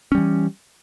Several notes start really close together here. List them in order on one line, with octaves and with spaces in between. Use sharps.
C#4 G3 E3